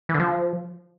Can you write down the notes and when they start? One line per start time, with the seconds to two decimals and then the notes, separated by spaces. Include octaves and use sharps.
0.09 E3
0.14 D3
0.20 F3